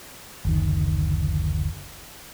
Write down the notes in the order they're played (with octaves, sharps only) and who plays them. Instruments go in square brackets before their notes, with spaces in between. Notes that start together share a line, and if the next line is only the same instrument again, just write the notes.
[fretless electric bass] F#1 D2 D#3